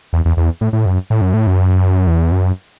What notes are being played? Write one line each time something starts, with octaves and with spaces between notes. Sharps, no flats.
E2
E2
E2
A2
A2
F#2
A2
F#2
A2
F#2
E2
F#2